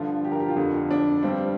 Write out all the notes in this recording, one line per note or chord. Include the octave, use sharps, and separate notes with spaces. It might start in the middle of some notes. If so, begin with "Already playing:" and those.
Already playing: G2 D3 F3 F4
G4
A#4
G4
F4
F2 D3 F3
D4
G2 G3 C4